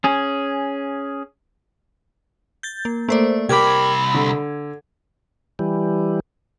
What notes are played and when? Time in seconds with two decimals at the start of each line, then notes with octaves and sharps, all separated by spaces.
0.04 C#4 G#4
2.63 G6 A6
2.85 A#3
3.09 A3 A#3 C5 D5
3.49 C2 G4 A#4 B5 D6 G#6
4.14 D3
5.59 E3 G3